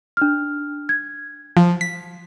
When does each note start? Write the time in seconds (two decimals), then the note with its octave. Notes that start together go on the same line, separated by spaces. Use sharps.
0.17 D4 F6
0.89 G#6
1.57 F3
1.81 B6